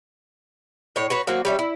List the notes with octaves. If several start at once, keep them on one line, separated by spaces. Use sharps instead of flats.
A2 C#5
F#4 B4 C#5
F#3 A#3 C4 F#4
G3 C#4 E5
E4